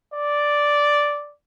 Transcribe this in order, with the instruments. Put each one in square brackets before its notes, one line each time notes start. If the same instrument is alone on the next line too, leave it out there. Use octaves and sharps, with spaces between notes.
[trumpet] D5